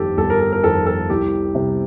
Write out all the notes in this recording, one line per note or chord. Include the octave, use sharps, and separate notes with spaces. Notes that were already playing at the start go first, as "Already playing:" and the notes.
Already playing: G1 F2 D#3 G4 A4
G1 A4
A#4
A4
A#4
F2 D#3 A4
A4
C2 G4
C3 G3